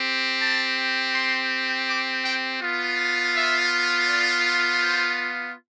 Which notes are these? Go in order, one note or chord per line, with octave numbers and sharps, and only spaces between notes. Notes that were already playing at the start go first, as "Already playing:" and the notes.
Already playing: C4 G4
A5
C6
D6
G5
B3 F4
E5
D5
C5